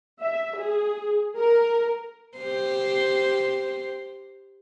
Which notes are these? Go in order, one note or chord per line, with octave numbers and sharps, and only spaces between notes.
E5
G#4
A#4
G4 C5